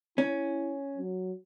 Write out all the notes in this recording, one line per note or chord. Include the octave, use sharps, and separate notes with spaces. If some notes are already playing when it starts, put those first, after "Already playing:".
C#4 E4
F#3